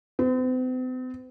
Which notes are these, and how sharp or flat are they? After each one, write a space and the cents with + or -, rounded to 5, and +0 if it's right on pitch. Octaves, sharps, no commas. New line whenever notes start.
C4 -45